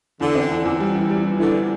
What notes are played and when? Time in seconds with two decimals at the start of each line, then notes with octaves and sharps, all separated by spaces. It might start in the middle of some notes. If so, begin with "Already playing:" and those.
0.21 E2 D3
0.35 C4
0.51 E2
0.65 E2
0.80 G3
0.95 E3
1.10 G3
1.24 E3
1.40 D3 E3